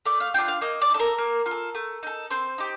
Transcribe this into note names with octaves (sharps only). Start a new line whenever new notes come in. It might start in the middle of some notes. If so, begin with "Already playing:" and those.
A3 D5
F5
D4 F4 G5
F5
A#3 D#5
D5
D#4 A4
A#4
A#3
F4
A4
A3
D#4 A4
C4 C5
D#4 G4